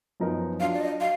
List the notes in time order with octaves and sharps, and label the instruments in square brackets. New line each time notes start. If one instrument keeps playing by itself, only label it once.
[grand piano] F#2 F3 B3 D#4 A#4
[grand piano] F#3 D4 F4 [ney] F5
[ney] D5
D#5
[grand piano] F#4 [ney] F5